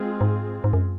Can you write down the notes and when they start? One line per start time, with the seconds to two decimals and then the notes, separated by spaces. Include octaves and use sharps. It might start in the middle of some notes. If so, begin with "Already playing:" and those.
Already playing: G#3 C4 F4 G#4
0.21 G#2
0.64 G#2
0.73 F#2